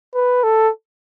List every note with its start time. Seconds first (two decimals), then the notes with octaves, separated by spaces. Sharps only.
0.15 B4
0.43 A4